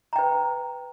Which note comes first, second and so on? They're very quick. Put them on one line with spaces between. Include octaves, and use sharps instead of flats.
A#5 G5 B4